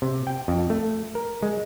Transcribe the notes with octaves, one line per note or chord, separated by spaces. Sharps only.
C3
G5
F2
A3
A#4
G#3